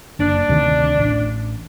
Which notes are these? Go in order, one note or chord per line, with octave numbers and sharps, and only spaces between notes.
F#1 D4
D2 C3 D#3
A1